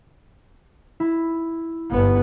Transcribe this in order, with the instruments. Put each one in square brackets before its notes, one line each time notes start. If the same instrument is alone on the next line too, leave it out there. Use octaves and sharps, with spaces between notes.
[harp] E4
[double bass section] G1 B3